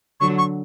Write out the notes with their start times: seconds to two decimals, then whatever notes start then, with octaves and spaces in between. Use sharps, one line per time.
0.20 D3 F#3 C#6
0.38 C#6